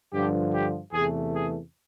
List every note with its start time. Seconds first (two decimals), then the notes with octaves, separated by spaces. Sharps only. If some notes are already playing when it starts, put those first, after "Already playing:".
0.13 G2 D3 F3 G4
0.53 G4
0.93 E2 C3 E3 A3 G#4
1.34 G#4